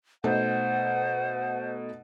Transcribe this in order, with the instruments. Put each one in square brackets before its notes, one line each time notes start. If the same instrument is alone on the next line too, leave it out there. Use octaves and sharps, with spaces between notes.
[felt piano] B2 A3 D#4 [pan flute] C5 [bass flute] F#5